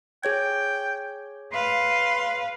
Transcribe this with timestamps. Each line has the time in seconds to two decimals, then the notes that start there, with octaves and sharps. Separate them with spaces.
0.23 G#4 C#5 G5 G#6
1.52 B4 F5 C6